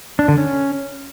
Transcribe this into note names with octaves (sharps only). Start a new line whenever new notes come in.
D4
D3
C#4